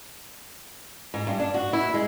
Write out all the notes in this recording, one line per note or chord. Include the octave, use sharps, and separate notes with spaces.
G#2
G2
D4
F#4
E4
G#3